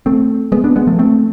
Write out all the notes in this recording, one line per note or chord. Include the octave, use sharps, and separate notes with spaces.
A3 C4
G#3 B3
B3 D4
G#3 B3
F3 A3
A3 C4